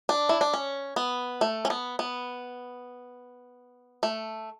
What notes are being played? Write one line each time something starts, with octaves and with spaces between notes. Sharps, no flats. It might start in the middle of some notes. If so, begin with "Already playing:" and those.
D4
E4
D4
C#4
B3
A3
C#4
B3
B3
A3